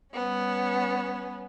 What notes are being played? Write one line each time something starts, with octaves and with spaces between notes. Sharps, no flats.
G3 B3 C#4